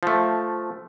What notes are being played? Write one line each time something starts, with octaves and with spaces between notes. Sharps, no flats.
F3 A3